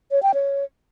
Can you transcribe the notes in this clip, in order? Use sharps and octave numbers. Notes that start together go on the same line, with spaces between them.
C#5
G5
C#5